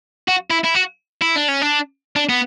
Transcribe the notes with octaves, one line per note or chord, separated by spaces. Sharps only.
F#4
E4
E4
F#4
E4
D4
C#4
D4
D4
B3